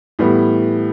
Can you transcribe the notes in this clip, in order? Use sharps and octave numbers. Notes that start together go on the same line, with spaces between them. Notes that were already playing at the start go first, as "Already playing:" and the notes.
A2 E3 G3 B3